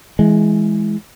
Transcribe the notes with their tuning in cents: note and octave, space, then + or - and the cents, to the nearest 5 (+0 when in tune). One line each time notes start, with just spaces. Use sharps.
E3 +0 G#3 +15